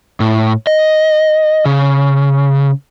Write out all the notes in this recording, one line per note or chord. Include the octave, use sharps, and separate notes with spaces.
A2
D#5
C#3